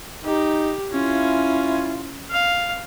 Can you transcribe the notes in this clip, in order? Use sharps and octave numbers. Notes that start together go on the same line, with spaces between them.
D#4 G4
C#4 E4 F4 G#5
F5